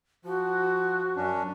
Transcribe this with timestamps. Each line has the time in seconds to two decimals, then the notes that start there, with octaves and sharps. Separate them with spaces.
0.25 F3 F#4
1.16 F#2 C#4 D4